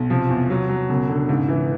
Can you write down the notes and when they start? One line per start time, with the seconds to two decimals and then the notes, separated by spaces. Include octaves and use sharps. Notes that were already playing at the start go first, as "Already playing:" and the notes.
Already playing: B1
0.10 C3 F3
0.30 E2
0.50 F#3
0.69 F#3
0.89 E1 C#3
1.09 D3
1.29 G#2 C#3
1.48 E3